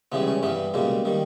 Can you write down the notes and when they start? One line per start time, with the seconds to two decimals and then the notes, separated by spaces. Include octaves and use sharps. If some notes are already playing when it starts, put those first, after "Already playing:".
0.12 C#2 C#3 E3 G3 B3
0.27 C#4
0.43 G2 E3 G3 B3
0.74 C#2 B2 G3 A#3
1.05 D#3 G3